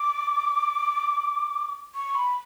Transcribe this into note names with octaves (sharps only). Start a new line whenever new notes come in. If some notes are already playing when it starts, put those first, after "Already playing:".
Already playing: D6
C#6
B5